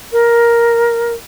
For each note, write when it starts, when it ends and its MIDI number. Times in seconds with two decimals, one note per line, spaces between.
0.12 1.13 70